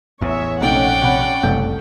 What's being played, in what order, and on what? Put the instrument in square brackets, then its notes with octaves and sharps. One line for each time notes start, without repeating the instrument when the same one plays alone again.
[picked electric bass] A1 E2 [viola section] C#5 E5
[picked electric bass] A#1 [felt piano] C3 A3 D#4 [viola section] C#4 F#5 [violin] D5 G5
[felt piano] C3 B5
[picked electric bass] F#1 [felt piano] C2 A3 G6